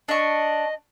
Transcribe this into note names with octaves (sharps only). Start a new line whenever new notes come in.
D4 D#5 C#6